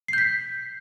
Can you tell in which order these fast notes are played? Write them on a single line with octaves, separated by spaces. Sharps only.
C7 G6 B6